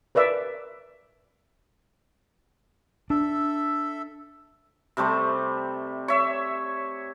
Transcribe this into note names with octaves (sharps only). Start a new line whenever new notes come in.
A#4 B4 D5 E5
D4 A4 E5
C3 G3 A3 C5
C#5 E5